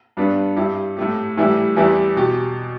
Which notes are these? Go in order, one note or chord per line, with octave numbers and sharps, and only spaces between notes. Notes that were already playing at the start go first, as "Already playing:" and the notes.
G2 G3 B3 D4
G2 G3 E4 G4
A2 A3 G4
A2 E3 G3 E4 G4
E2 E3 G3 E4 G4
B2 G4